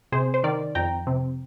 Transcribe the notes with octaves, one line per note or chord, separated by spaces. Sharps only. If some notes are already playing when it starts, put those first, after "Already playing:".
C3 G#4 C5
C5
D#3 A#4 D5
F2 G5 A#5
C3